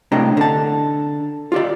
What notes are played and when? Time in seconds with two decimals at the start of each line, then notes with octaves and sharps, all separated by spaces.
0.12 A2 C3 D4 D#5 G5 A#5
0.37 D3 A5
1.52 F4 G4 D5